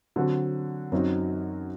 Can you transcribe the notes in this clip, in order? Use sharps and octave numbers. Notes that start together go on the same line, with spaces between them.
D3 F#3 C4 F#4
F#2 F#3 C4 D#4 F#4